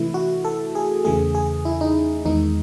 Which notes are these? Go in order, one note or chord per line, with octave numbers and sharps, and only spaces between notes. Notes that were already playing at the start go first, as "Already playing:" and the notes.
Already playing: C3 E3 A3 E4
F#4
A4
G#4
E2 C#3 E3 A3 G#4
G#4
E4
D#4
E2 D#3 G#3 D#4